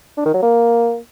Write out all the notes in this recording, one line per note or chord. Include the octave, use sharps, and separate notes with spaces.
D4
D#3
F#3
A#3